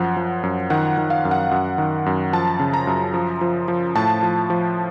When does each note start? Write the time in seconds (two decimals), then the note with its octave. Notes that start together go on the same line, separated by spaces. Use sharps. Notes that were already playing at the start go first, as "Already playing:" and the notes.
Already playing: F#2 F3 F#5
0.17 F3
0.43 F#2
0.70 D#3 F#5
0.98 D#3
1.10 F5
1.25 F#2
1.31 F#5
1.51 F#2
1.78 D#3
2.06 F#2
2.33 F3 A5
2.59 C#3
2.74 A#5
2.87 F#2
3.14 F3
3.41 F3
3.68 F3
3.95 A2 A5
4.23 F3
4.50 F3